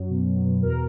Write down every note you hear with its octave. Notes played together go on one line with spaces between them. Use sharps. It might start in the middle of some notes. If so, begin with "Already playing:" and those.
Already playing: F#2 F#3
B2
F#3
B2
E2 A#4